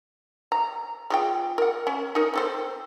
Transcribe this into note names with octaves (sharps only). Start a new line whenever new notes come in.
A#5
G#3 F4 G5
A#4 F#5
C#4
D#4 A#4
C4 A4 C5